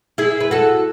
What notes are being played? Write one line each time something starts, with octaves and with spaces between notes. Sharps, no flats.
E4 G#4
B4
F#4 A4